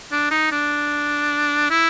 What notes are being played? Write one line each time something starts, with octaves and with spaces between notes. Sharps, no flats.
D4
D#4
D4
E4